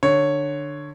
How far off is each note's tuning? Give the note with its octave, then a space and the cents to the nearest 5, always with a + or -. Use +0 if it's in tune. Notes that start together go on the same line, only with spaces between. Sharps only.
D3 +15 C#5 +0